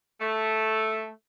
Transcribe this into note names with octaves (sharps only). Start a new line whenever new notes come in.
A3